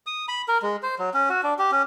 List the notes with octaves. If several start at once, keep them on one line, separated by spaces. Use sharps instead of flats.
D#6
B5
A#4
G#3
C5
F#3
C#4
F#4
D4
G4
C#4